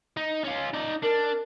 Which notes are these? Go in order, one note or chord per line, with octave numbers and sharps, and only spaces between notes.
D#4
C#4 F4
D#4 D5
D4 A#4